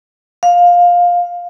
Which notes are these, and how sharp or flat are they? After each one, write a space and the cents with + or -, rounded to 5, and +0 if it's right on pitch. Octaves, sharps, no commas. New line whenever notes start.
F5 +15